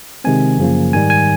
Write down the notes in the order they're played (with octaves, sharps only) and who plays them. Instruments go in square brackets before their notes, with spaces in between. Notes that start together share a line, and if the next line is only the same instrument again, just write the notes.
[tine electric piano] C3 D#3 G#3 C4 G#5
F#2 C#3 F3 A#3
G#2 D#3 G3 G#5
G#5